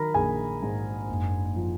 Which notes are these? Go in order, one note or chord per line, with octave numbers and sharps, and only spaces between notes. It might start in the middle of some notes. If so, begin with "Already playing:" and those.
Already playing: D#3 F#3 A#4 A#5 B5
A#1 G#4 G#5
G#2
F#1
F3